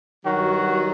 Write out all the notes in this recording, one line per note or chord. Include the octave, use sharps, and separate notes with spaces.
G2 D#3 F#3 F#4